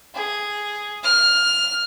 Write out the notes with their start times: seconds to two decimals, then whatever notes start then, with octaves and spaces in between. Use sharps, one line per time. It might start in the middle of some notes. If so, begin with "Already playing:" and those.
0.15 G#4
1.04 F6